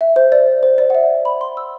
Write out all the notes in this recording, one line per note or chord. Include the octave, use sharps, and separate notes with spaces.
E5
C5
D5
C5
D5
F#5
E5
B5
C6
E6